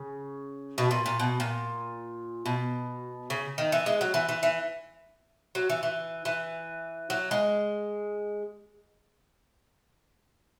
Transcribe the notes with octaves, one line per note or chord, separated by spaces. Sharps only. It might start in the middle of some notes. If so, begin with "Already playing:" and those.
Already playing: C#3
B2
A#2
A#2
B2
A#2
B2
C#3
D#3
E3
G#3
F#3
E3
E3
E3
F#3
E3
E3
E3
F#3
G#3